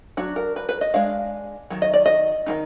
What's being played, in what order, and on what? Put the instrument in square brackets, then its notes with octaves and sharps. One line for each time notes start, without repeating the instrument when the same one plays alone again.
[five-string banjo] F#3 D4 F#4
A#4
B4
B4
D#5
G#3 D4 F5
D#3 F#3
D#5
D5
D#5
D#3 G#3 D#4